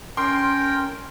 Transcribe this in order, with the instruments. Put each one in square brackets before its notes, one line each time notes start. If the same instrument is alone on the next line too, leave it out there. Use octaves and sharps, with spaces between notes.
[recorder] C#4 [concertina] A#4 G5 [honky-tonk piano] C6